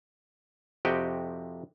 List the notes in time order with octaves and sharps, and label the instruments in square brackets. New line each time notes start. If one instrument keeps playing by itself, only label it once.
[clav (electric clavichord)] F2 C3 F#4 G4 D#5 G5